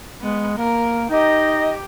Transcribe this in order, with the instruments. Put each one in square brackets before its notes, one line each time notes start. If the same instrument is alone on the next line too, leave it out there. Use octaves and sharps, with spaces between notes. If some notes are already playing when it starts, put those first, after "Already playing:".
[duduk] G#3 [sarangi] B3
[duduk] A#3 [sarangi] A#4
[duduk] D#4 [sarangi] G4 [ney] D#5